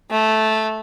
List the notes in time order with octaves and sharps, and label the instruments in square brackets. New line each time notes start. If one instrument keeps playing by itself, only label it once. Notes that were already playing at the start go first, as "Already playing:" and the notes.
[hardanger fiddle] A3